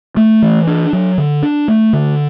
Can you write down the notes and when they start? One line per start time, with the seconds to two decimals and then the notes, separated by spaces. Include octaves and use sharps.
0.17 A3
0.42 E3
0.67 D4
0.93 F#3
1.18 D3
1.43 D4
1.68 A3
1.93 D3